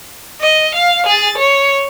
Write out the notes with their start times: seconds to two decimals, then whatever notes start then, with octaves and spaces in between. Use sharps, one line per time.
0.41 D#5
0.74 F5
1.06 G#4 A6
1.38 C#5